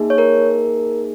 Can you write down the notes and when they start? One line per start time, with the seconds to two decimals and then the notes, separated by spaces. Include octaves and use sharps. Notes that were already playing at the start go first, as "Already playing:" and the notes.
Already playing: A#3 D#4 G#4
0.10 C#5
0.18 A#4